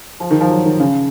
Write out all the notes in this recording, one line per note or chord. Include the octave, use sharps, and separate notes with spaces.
F3
D#3
F3
F#3
D#3
C#3